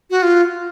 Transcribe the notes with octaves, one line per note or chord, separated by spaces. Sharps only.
F#4
F4